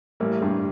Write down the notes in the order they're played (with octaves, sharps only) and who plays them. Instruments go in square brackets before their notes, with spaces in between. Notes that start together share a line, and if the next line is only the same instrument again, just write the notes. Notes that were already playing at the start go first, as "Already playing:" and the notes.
[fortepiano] A1 [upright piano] G3 A#3
[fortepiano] G2 [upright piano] A#3 D4